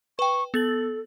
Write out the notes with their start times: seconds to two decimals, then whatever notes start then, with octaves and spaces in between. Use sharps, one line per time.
0.19 B4 G5 C#6
0.54 B3 A4 A6 F#7